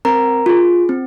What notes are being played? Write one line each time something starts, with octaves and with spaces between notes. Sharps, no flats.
C4 A#4 A#5
F4 G#4
C4